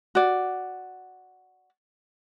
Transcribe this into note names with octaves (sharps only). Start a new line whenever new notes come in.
F#4 D5